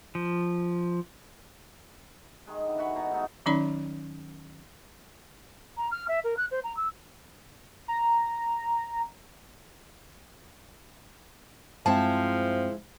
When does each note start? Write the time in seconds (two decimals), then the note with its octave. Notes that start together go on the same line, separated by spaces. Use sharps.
0.15 F3
2.47 D#3 G#3
2.65 D3 E3
2.78 E3 F#4 B5 C#6
2.96 B2 A#5
3.11 G#2 A3 D#4
3.46 D#3 F#3 C#4 D#4 D5 B5
5.77 A#5
5.91 F6
6.08 E5
6.24 A#4
6.37 F#6
6.51 C5
6.64 A#5
6.77 E6
7.88 A#5
11.86 G2 F3 G#3 C4 E4 C5 G5 A5